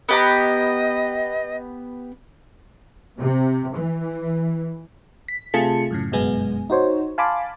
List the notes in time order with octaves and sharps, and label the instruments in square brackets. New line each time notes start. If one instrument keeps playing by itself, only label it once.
[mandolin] B3 G4 A#5 [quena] D#5
[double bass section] C3
E3
[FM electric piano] B6
C3 A3 F4 G#4 A5 C#7
F#2 A2 C#3
G1 F#2 B2 G#3 B3 G#5
D#4 F#4 C5 C#5
F5 G#5 A5 B5 C6 D6